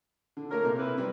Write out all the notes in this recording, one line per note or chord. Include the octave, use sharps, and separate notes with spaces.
D3
A3 A#3 A#4 C#5
C3
E4 B4
G3 C4